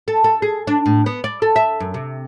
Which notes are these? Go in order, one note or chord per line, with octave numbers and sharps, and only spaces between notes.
A4
A4
G#4
D4
A2
B3
D5
A4
E5
F#2
C3